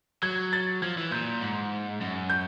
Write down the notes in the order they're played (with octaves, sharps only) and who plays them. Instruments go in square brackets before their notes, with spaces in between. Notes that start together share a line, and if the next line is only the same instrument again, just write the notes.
[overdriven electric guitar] F#3 [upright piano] G#6
[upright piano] A6
[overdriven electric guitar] F3 [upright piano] G#6
[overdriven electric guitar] E3
[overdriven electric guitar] A#2 [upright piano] G6
[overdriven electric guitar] G#2
F#2
[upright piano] G6